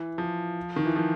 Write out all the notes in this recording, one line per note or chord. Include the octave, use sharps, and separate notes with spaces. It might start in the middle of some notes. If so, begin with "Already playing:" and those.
Already playing: E3
F3
D#3
E3
F3